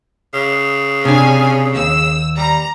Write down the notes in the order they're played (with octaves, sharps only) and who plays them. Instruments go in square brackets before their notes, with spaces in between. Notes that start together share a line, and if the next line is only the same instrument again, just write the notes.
[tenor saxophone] C#3
[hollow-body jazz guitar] C3 D4 [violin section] G#5
[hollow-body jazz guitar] D#2 [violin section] E6
[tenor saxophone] G3 [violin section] A#5